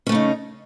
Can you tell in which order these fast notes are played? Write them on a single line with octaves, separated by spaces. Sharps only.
C#4 A3 C#3 D#4